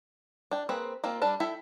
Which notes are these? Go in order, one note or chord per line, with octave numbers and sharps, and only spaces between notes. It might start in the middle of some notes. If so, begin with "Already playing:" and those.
D4 G5
A#3 C4 G#4 B4
A#3 C4 F4
G3 D4 A5
E4 A4 E5 G5